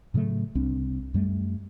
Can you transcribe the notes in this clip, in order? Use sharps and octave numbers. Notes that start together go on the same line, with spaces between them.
A2 C#3 F#3 A3
C2 C4 D4
F#2 G3 A3